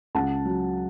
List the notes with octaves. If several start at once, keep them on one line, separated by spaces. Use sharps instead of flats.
C#2 F#5 A5
F#3